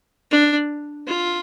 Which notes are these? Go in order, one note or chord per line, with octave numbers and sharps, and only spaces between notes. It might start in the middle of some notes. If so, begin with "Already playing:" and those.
D4
F4